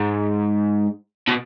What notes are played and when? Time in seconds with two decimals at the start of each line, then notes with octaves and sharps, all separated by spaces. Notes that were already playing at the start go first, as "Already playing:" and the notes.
Already playing: G#2
1.28 B2